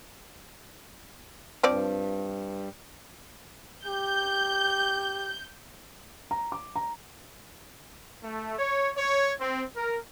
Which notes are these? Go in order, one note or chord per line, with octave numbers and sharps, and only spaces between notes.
G2 F3 C4 D5
G4 G6
A#5
D6
A#5
A3
C#5
C#5
C4
A#4